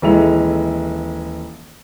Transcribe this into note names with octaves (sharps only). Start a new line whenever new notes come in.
D#1 E3 G#3 A4 E5 F7